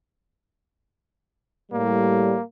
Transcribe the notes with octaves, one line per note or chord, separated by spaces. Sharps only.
A2 G3 A#3